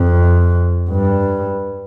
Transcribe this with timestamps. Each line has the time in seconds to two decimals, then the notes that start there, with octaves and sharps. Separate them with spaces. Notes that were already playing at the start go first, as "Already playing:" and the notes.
Already playing: F2
0.90 G2